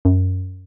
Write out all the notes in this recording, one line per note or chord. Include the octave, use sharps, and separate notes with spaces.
F#2